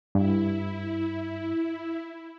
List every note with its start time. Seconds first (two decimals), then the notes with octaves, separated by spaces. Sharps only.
0.15 G2 E4